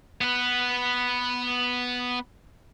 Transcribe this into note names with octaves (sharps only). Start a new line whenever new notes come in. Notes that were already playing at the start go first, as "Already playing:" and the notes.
B3 B4